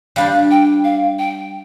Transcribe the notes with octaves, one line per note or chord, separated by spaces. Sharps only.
G3 D4 G4 F5
G5
F5
G5